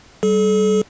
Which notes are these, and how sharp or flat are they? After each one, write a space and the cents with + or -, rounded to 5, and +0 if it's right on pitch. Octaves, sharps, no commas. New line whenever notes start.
G3 -15 A4 -40